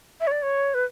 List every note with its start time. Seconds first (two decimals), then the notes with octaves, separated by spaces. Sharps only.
0.21 E5
0.27 C#5
0.31 D5
0.42 C#5
0.74 B4